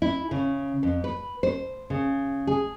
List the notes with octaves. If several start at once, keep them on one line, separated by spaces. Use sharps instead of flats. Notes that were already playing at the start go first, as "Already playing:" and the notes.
E4
C#3
F2
B4
C5
C#3
G#4